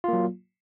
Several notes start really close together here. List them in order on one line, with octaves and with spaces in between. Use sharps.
F4 A#3 F#3